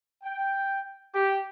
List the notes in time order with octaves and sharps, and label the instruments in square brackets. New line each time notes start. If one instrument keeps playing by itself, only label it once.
[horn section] G5
G4